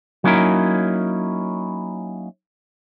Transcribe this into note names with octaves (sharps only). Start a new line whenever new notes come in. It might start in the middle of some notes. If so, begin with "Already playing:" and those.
F#3 A#3 C#4 D#4 E4 A#4